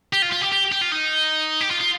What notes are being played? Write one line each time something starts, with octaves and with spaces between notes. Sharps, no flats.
G4
F4
F4
G4
G4
G4
F4
D#4
G4
F4
F4